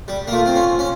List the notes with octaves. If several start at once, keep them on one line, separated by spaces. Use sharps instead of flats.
G3
A#3
A3 F4
C4
C#4
C#4